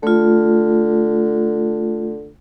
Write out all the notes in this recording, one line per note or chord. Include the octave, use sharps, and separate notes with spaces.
D3 A3 F4